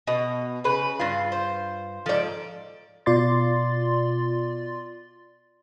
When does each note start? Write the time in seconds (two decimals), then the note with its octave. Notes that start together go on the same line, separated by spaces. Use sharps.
0.07 B2 D#5
0.64 C#3 B4
0.99 G2 F4
1.32 C5
2.06 G#2 F3 A4 D5
3.06 B2 F4 D5 C6 A6